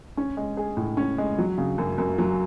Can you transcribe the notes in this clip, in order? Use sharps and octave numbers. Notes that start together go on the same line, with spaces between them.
C#4
G#3
G#4
A2
C#4
G#3
F#3
C#3
F#2
F#2
F#3